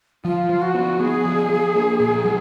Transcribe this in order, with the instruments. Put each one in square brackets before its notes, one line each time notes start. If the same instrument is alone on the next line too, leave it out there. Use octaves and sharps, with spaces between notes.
[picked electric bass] F3 [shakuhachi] F4
[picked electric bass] F3
[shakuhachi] F#4
[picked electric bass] B3
[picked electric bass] B3 [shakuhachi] G#4
[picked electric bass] F3
F3
A#3
A#2
F#3